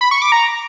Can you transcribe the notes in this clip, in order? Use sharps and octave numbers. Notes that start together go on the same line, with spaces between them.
B5
C#6
D6
A#5